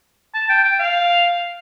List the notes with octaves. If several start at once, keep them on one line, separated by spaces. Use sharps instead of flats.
A5
G5
G5
F5